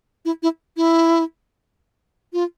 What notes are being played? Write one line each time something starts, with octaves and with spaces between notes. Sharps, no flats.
E4
E4
E4
F4